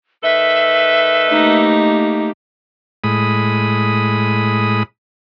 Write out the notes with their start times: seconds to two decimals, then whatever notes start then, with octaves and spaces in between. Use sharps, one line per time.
0.23 D#3 A4 B4 E5
1.30 A3 A#3 D#4 G4
3.04 A2 G#3 B5 D#6